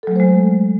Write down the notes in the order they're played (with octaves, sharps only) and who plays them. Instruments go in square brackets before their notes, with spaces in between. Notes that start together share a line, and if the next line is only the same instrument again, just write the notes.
[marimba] A4
F#3
A3
C5
G#3